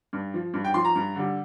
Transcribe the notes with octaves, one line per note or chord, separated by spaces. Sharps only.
G2
F3
G2
G5
F3 C6
A#5
G2
D3 G3